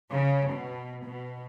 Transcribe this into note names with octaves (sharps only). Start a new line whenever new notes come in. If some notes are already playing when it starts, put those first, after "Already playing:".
C#3
B2
B2